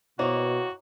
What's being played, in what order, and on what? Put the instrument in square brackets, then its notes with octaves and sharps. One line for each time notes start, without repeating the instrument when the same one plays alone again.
[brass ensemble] B2 [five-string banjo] D#3 A#3 [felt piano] E4 C5 C#5 [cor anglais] F#4